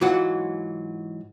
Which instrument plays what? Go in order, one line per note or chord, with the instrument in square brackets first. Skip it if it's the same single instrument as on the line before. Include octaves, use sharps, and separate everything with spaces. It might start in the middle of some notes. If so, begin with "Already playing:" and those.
[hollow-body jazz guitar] G#2 E3 F#3 F4 F#4